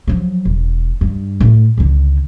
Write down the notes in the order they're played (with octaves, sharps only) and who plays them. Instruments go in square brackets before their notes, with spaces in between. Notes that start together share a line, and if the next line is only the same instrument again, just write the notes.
[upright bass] F3 F#3
E1
G2
A2
C#2 D3